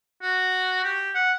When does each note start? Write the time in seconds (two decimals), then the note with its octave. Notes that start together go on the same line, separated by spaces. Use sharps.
0.22 F#4
0.84 G4
1.14 F#5